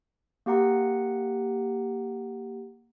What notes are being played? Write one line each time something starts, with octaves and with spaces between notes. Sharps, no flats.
A#3 G4 F#5 A#5